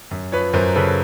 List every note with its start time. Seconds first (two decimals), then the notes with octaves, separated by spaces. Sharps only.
0.11 F#2
0.32 F3 B4 C#5
0.53 F#2 A#4 C5
0.75 C#3 A4 B4